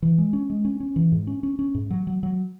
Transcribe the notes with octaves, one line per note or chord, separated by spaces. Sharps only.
E3
G#3
C#4
G#3
C#4
C#4
E3
G#2
C#4
C#4
C#4
G#2
F#3
F#3
F#3